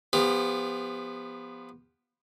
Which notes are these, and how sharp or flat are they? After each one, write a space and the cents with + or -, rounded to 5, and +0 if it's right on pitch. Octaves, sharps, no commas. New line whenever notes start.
F3 +0 B3 +0 G4 +35